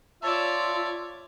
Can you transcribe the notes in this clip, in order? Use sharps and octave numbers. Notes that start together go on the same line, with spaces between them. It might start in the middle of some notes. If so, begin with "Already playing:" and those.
F4 C#5 D5 E5 A5